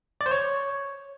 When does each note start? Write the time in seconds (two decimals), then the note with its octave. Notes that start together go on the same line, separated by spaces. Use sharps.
0.21 D5
0.26 C5
0.31 C#5